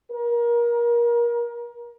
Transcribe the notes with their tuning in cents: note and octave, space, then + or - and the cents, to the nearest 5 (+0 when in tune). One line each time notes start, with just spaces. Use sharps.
A#4 +25